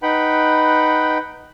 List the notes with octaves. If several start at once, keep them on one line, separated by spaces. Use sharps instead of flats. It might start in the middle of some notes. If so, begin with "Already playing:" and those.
D#4 B4 F#5 G5 B5